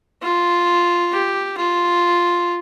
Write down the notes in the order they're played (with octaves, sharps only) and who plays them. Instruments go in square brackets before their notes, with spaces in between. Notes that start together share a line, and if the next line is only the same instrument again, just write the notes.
[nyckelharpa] F4
G4
F4